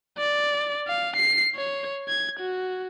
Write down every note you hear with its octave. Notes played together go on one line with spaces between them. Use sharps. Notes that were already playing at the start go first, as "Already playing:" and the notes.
D5
F5
C7
C#5
G#6
F#4